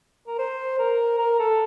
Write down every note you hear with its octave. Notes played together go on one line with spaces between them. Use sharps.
A#4
C5
A#4
A#4
A4